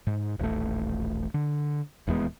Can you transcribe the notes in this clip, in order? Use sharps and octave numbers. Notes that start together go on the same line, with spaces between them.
G#2
D#1 A1 A3
D3
D#1 E2 G#3 B3